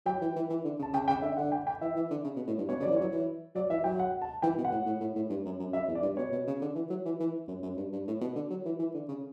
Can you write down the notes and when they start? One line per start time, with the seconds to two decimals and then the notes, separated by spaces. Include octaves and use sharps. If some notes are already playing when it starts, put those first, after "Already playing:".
0.06 F#3 G5
0.21 E3
0.36 E3
0.50 E3
0.64 D3
0.79 C#3
0.83 A5
0.93 C#3 G5
1.08 C#3 G5
1.22 D3 E5
1.37 D3 F#5
1.52 G5
1.67 G5
1.81 E3 E5
1.96 E3
2.10 D3
2.24 C#3
2.36 B2
2.47 A2
2.58 G2
2.69 B2 C#5
2.80 C#3
2.83 F#3 D5
2.90 E3
2.96 F#3 C#5
3.11 E3
3.55 F#3 D5
3.70 E3 E5
3.84 F#3 G5
3.99 F#5
4.22 A5
4.42 E3 G5
4.57 B2
4.65 F#5
4.71 A2
4.86 A2
5.00 A2
5.16 A2
5.30 G2
5.45 F#2
5.60 F#2
5.73 F#2 E5
5.88 E2
5.95 D5
6.02 G2
6.17 B2 C#5
6.32 B2
6.47 C#3
6.61 D3
6.75 E3
6.90 F#3
7.05 E3
7.20 E3
7.48 F#2
7.63 F#2
7.77 G2
7.93 G2
8.07 A2
8.21 B2
8.35 D3
8.50 F#3
8.65 E3
8.79 E3
8.94 D3
9.08 C#3